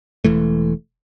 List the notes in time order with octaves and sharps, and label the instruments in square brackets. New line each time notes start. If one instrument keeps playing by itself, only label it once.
[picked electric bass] E1 E3 A3